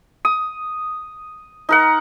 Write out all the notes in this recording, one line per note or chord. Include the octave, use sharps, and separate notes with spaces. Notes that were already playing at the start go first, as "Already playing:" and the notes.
D#6
D#4 A#4 F#5